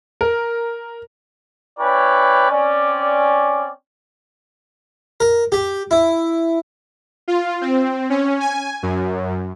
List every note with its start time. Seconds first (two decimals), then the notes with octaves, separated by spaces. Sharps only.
0.21 A#4
1.79 C#4 E4 B4 C#5 D5 G5
2.50 C4 C#4 D5
5.20 A#4
5.52 G4
5.91 E4
7.28 F4
7.61 C4
8.10 C#4
8.40 G#5
8.83 F#2